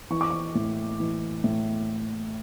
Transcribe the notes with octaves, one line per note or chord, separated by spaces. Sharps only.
E3 C#6
D6
C#6
A2
E3
A2